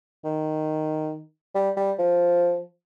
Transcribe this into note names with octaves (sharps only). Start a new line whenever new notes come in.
D#3
G3
G3
F3